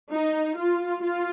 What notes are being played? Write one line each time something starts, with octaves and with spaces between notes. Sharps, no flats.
D#4
F4
F4